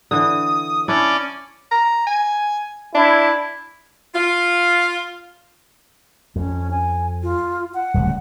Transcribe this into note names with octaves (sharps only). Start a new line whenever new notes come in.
D3 E3 D#6
C#4 D4 E4 D5
A#5
G#5
D4 E4
F4
F2 C#4
G#5
F4
F#5
D1 C#2 G3